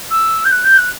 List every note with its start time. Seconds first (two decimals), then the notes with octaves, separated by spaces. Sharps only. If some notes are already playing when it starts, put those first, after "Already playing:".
0.10 E6
0.44 G6
0.51 F#6
0.63 G6
0.77 F#6